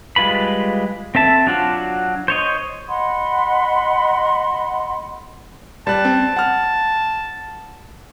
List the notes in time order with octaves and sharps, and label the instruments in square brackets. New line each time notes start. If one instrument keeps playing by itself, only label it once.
[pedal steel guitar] G3 G#3 F4 B4 B5
C4 A4 E5 A5
F#3 D4 F4 F#4
C5 C#5 D#5
[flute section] D#5 F#5 B5 C6
[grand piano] G3 F#6 [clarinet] A5
[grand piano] C4
F#5 F6